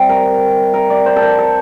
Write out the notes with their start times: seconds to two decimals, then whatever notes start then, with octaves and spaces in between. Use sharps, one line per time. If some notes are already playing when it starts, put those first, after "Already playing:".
Already playing: C3 G3
0.09 A#4
0.74 A#4
0.90 D5
1.06 C5
1.16 A4
1.22 A#4
1.38 A4